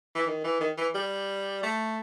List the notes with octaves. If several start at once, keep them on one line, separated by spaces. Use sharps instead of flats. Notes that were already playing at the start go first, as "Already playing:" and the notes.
E3
D#3
E3
D#3
E3
G3
A3